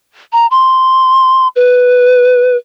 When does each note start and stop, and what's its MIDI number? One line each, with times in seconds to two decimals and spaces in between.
0.33 0.47 82
0.51 1.48 84
1.56 2.57 71